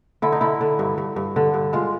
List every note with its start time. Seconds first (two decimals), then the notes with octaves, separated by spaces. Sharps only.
0.22 D3 E4
0.32 D#4
0.41 D3 E4
0.61 D3
0.79 G2
0.98 G2
1.16 G2
1.36 D3
1.54 G2
1.73 G#3 F4